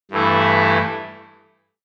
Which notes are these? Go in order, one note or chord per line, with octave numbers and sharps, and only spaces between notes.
G2 E3 A3 E4